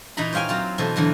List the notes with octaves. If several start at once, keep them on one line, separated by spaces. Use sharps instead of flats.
A#2 E3 D#4 A#5 B5
C5 C#5 F5 G5 G#5
F#3 C4 F4
B2 E3 A4 C5
E2 D3 E3 F#3